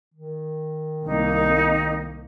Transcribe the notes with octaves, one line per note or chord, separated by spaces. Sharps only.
D#3
C2 A#3 D#4